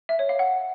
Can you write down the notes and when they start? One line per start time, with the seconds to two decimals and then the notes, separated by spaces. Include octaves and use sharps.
0.09 E5
0.19 C#5
0.29 F5
0.39 F#5